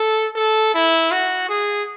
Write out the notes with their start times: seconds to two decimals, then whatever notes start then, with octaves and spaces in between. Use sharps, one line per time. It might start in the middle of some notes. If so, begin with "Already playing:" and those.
Already playing: A4
0.36 A4
0.74 E4
1.12 F#4
1.49 G#4